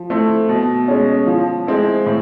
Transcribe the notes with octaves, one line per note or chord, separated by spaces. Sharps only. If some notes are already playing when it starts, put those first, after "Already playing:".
Already playing: F3
A3 C4 E4 A4
B2
G#3 C#4
F3
G#3 C4 E4
A2